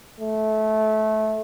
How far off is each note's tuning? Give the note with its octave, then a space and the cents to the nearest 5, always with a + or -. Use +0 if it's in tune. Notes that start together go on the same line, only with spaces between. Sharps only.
A3 -20